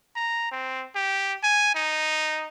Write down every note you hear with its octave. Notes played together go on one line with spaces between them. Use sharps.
A#5
C4
G4
G#5
D#4